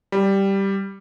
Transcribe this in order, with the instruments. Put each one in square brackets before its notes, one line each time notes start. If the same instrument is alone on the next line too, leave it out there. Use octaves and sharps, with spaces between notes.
[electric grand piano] G3